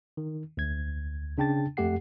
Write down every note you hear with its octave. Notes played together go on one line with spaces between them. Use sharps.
D#3
D2 G#6
C#3 D4 G5 A5 A6
F2 A3 G4 F#5 C7